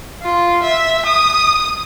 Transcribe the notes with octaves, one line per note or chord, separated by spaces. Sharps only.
F4
E5
D#6